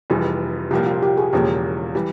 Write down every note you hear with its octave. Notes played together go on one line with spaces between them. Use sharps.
F1 F2 E3 G3 G#4
C2 A#2 F3 A#3 G4
F4
G4
G#4
E1 E2 C#3 F3 A#3 G4
E3 G3